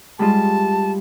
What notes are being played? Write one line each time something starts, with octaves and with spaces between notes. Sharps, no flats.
G3 G#3 F4 A5